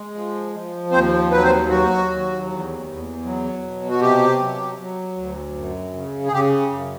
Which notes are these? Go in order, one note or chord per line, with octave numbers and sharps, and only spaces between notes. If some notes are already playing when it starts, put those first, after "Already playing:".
Already playing: G#3
F3
F3
D#2 C4 C5
F#3 B4
C4 C5
F#3 F#4
D#2
E2
E2
F#3
B2
F#4
C3 G4
F#3
F#3
D2
F#2
C#3
G#4
C#3 G4
F#2